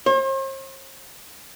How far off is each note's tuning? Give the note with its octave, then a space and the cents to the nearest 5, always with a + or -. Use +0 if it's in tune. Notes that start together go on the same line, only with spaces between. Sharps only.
C5 +45